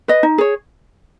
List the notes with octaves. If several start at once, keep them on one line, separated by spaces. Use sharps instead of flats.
B4 D#5
D#4
G#4 C#5